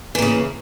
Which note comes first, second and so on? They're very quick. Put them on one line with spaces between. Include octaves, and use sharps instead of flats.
E3 A#3 C#3